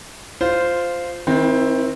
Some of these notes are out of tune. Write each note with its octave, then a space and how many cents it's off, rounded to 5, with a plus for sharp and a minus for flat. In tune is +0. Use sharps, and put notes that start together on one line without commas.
F4 +0 C5 -10
D#3 +40 C4 +10 E4 +0